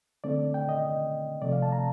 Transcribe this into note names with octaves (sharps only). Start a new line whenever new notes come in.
D3 A3 C4 D5
G5
D#5
C3 F3 A3 D5
F5
A5
A#5